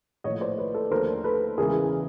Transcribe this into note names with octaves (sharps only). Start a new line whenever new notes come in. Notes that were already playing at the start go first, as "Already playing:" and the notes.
A#1 A2 F3 C#5 D#5
C5 D5
B4 C#5
A4 B4
D#2 D3 F3 A3 A#4 C5
A4 B4
E2 C#3 E3 G#3 G#4 A#4